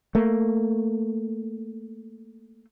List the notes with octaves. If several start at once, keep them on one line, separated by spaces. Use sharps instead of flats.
A3 A#3